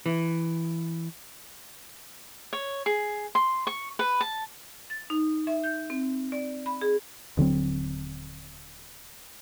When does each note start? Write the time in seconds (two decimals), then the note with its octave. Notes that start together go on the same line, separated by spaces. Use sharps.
0.06 E3
2.53 C#5
2.86 G#4
3.35 C6
3.67 C#6
3.99 B4
4.21 A5
4.90 A6
5.10 D#4
5.47 E5
5.64 G6
5.90 C4
6.32 D5
6.66 B5
6.81 G#4
7.37 D#1 D3 F#3 C4